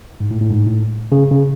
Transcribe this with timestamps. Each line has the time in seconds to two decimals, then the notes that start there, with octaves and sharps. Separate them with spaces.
0.20 G#2
0.31 A2
0.41 A2
0.50 G#2
0.66 A2
1.12 C#3
1.31 C#3